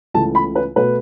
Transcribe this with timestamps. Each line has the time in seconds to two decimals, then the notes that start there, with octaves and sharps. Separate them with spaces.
0.14 C#2 C#3 E3 A3 A5
0.35 B5
0.55 B4
0.76 B2 A3 B4